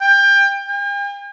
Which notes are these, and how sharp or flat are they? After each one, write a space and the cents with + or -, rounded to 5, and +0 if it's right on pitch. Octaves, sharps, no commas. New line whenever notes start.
G5 +25
G5 +45